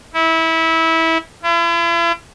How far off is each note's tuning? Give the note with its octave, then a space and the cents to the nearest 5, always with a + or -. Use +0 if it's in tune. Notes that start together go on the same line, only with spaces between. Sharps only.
E4 -20
E4 +45